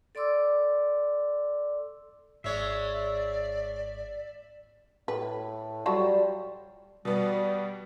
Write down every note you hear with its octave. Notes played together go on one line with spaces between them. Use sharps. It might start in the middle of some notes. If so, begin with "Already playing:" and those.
A4 D5 C6 D6 E6
G#1 G#2 G#3 C#5 D5 E5
A2 B4
F#3 G3 F4 A4
B2 G3 B3